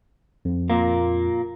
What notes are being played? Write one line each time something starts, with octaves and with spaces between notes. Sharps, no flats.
F2
A#2 A#3